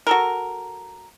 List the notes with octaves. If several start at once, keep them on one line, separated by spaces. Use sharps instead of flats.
F#4 A4 A#4